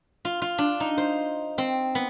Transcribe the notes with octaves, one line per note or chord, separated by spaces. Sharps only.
F4
F4
D4
D#4
C5
C4
B3